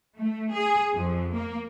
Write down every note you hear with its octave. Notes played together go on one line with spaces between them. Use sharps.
A3
G#4
F2
A#3